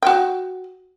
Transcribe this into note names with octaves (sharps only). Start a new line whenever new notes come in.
F#4 G5